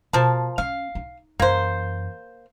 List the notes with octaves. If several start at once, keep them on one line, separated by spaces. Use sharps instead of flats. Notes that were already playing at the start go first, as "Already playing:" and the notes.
B2 F3 A#4 A5
C#4 F5
D#4
F#2 E3 A#3 C5